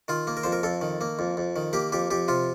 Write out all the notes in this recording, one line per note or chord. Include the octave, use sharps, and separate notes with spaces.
D#3 F4
A#3
A#4
F2 C5
A#4
F2 A4
D#3
A#3
F2
F2
D#3
A#3 G4
F2 G4
F2 G4
C3 F4